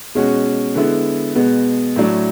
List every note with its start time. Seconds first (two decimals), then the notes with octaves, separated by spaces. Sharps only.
0.15 B2 G#3 C#4 F#4
0.75 D3 G#3 B3 E4
1.36 B2 G#3 B3
1.96 A2 F#3 A3 D4